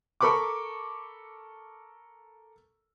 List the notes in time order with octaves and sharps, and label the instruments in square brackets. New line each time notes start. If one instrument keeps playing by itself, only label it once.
[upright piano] A4 A#4 B5 C#6 D6